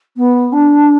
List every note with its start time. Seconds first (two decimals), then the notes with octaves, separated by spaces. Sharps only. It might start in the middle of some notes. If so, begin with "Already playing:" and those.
0.17 B3
0.52 D4